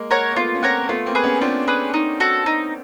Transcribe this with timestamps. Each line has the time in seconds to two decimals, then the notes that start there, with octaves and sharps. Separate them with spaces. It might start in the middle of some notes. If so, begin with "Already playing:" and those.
Already playing: G#3 A#3
0.11 A#4 C#5 F#5
0.31 A#3
0.36 A3 B3 F4
0.54 C#4
0.62 A#3 C4 A#4 C#5 F#5
0.83 A#3
0.89 A3 B3 F4
1.06 A#3 C4
1.15 G#4 B4
1.24 B3 C#4
1.41 C4 D4 F4
1.67 G#4 B4
1.94 D#4
2.20 F#4 A4
2.46 D#4